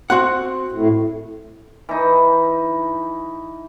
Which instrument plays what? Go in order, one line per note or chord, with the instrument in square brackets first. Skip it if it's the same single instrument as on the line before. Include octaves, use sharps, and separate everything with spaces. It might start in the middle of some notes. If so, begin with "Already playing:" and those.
[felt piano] C4 C6 [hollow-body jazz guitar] F#4 F#5
[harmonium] A2
[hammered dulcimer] E3 D#4